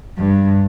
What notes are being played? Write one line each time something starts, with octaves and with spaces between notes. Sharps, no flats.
G2